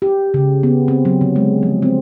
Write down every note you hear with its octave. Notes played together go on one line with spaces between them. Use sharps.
G4
C#3
B3
C4
F#3
D3
G#3
F3
C4